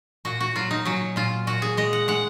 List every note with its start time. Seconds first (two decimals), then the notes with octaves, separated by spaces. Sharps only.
0.25 A#2 F#4
0.40 F#4
0.56 F#3 F4
0.71 D#4
0.85 F#3 C#4
1.16 A#2 F4
1.47 A#2 F#4
1.62 G#4
1.77 G#3 D#5
1.93 F#5
2.08 G#3 F#5